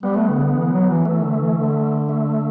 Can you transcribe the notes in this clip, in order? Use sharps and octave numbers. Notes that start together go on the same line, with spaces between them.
G3 B3
A3
D3
C#3
D3
E3
F#3
E3
E3 A3
D3
E3
D3
A3